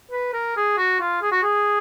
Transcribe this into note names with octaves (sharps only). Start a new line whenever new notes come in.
B4
A#4
G#4
F#4
F4
G#4
F#4
G#4